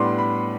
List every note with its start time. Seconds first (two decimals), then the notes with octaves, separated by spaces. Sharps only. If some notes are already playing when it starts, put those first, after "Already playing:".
Already playing: A2 G3 B3 D4 C6 D6
0.18 B5